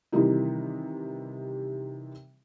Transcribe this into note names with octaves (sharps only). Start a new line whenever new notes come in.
C3 D#3 E3 G3 D#4 E4